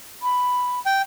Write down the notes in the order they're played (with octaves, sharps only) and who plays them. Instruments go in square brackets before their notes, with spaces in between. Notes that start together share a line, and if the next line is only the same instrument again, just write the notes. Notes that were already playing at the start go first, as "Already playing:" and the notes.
[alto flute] B5
[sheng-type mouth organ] G5